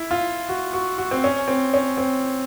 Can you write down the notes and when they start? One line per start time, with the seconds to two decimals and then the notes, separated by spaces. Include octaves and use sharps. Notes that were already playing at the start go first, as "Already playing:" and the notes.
Already playing: E4
0.11 F4
0.49 F#4
0.73 F#4
0.98 F#4
1.11 C4
1.24 C#4
1.48 C4
1.74 C#4
1.97 C4